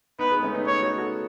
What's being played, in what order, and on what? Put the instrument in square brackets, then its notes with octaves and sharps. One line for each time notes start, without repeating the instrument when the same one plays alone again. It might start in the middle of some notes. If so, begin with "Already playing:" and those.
[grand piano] B3 D#4 [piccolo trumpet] B4
[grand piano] G#3 B3
A3 C#4
B3 D#4
[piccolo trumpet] C#5
[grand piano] D#4 F#4
F#4 A4